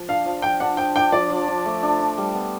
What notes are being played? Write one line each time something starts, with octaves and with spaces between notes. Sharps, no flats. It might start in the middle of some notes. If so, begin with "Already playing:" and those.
Already playing: F3
D4 F5
F3
F3 G5
D4 F#5
F3 G5
D4 G5
F3 D5
F3
D4
A3
D4
D4
G3
B3